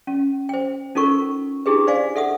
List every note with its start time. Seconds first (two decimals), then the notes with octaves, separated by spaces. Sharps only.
0.07 C#4
0.49 C5 G5
0.95 C#4 D#4 F4 A4 A#4 C#6
1.66 D4 E4 G4 G#4 B4
1.87 C5 D5 F5 G#5
2.16 A4 E5 F#5 D#6